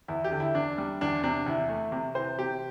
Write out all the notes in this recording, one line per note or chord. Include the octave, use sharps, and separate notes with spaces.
E2 E4
G4
D3
E4
E2 D4
G3
E2 D4
C3 D4
E2 E4
A3
C3
E3 C5
C3 G4